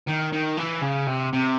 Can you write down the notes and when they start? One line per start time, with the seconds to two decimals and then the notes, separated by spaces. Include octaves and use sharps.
0.07 D#3
0.32 D#3
0.58 E3
0.82 C#3
1.08 C3
1.33 C3